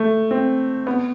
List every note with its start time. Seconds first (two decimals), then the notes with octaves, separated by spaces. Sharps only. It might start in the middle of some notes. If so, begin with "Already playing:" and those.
Already playing: A3
0.31 C4
0.87 B3